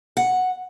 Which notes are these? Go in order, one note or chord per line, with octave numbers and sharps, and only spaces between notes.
F#5